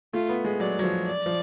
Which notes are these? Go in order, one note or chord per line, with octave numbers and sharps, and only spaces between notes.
A3 F4
B3
G#3
F#3 D5
F#3
F3
D5
F3